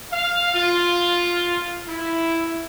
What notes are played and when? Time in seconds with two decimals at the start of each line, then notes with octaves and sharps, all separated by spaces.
0.12 F5
0.54 F4
1.88 E4